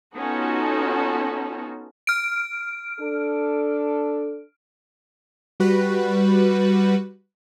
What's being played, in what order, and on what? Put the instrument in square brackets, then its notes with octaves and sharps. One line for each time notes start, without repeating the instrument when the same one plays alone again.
[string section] B3 C#4 D#4 F4 F#4 A4
[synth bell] F6 D7
[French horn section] D4 A4
[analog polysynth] G3 F#4 B4